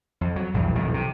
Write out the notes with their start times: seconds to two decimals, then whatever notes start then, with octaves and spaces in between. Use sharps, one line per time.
0.21 F2
0.36 F#3
0.54 A#1 E2 G2 G3
0.75 B1 F2 A2 D#3
0.94 C3